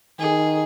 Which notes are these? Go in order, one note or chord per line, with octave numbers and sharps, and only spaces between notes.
D#3 G#4